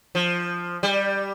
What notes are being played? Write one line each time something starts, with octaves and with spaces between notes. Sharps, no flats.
F3
G3